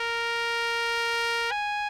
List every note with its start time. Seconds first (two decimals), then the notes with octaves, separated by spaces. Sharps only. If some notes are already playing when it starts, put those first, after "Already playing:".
Already playing: A#4
1.51 G#5